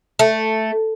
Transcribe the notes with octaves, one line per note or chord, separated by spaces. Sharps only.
A3